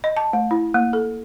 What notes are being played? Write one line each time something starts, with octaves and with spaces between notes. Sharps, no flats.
D#5
A5
A3
E4
A#3
A4